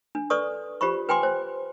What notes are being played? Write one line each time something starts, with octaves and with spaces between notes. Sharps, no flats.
D4
A4 B4 D5 C#6 D#6
F4 G4 C5 B5 C#6
B4 G5 G#5 C6 D6
C5